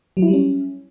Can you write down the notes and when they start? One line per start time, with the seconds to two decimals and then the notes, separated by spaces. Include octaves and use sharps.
0.17 F#3
0.22 E4
0.28 G3
0.33 C#4